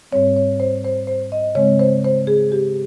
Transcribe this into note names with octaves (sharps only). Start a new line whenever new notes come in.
G#2 G3 C4 C#5
C#5
C5
C5
C5
D#5
C#3 G#3 C4 C#5
C5
C5
G#4
G4